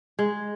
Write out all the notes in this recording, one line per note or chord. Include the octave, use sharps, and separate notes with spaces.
G#3